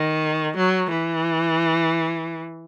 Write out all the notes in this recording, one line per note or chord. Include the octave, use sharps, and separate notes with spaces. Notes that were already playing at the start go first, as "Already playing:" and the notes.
Already playing: D#3
F#3
E3